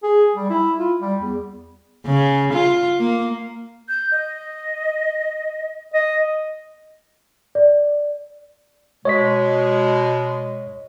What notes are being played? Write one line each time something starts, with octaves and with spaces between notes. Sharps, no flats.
G#4
G3
E4
F4
G3
E2
C#3
F4
A#3
G6
D#5
D#5
D5
B2 G#3 C#5 D#5 B6